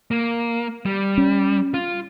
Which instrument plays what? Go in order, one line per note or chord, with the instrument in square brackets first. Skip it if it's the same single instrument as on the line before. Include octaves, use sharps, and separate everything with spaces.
[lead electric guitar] A#3
G3
[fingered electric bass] C#4
[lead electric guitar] F4